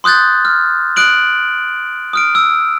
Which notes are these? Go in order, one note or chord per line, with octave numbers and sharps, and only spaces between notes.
C6 D#6 F#6 G6 A6
F6
D#6 F#6 D7 F#7
D#6 F6 D7
E6